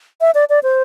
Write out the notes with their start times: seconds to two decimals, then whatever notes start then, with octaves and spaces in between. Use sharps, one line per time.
0.21 E5
0.35 D5
0.50 D5
0.63 C5